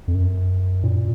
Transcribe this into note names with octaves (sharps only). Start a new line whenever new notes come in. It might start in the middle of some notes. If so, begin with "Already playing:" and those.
F2
F#2
A#2